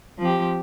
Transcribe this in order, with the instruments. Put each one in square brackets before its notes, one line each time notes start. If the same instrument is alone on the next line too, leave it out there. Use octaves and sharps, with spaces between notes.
[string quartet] F3 C4 G4